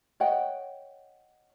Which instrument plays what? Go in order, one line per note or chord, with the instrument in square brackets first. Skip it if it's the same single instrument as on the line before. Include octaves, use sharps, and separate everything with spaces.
[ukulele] C#5 D#5 F#5 G5